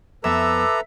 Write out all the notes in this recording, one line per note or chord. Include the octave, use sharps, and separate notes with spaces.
F2 B3 A4 B4 E5 A#5 D6